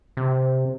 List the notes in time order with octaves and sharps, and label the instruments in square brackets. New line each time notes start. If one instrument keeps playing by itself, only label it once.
[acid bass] C3